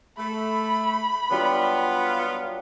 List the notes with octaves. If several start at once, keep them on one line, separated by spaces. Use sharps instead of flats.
A3 B5
F#3 G3 B3 D4 F4